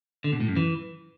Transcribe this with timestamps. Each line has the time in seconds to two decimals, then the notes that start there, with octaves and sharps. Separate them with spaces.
0.24 D3
0.32 B2
0.40 A2
0.48 F#2
0.56 E3